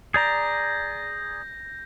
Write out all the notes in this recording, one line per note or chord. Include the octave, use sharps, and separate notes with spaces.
G#4 D5 A#5 G6 A#6